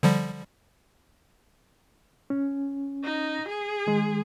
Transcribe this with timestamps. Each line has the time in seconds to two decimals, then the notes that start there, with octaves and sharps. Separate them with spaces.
0.03 D3 F3 G3
2.30 C#4
3.04 D#4
3.48 G#4
3.87 D#3 G#3